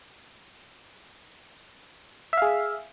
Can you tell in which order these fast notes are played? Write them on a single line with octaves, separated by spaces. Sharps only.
E5 F5 G#4